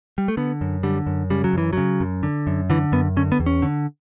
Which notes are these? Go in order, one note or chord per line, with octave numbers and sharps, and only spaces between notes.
G3
A3
D3 B3
F#2
D3 G3
F#2
C#3 G3
F#3
F#2 E3
C#3 F#3
F#2
D3
F#2
D3 E3
F#2 B3
D3 C#4
B3
E2
C#4
D3